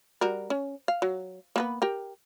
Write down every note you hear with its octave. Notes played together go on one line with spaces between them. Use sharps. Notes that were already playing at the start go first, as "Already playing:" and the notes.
G3 F#4 A#4
C#4
F5
F#3
A#3 B3 B4
G4 A#4 G5